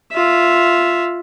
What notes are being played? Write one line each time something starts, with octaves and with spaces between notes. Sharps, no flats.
F4 E5